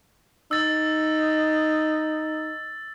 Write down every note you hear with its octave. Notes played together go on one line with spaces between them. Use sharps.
D#4 E6 A6